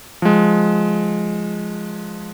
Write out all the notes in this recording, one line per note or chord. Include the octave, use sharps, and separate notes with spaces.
F3 G#3